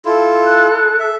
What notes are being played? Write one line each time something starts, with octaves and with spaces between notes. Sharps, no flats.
E4 F4 A4
F#6
E5